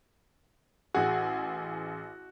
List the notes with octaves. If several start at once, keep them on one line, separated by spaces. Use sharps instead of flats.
A1 F#4 G#4